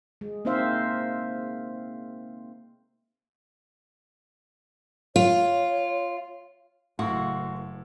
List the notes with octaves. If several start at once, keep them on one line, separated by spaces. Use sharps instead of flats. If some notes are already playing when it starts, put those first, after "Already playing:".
G#3
A#3 C4 D#4 C5 E5 F5
F4 C#5
F#1 A2 F#4 F5 C6 C#6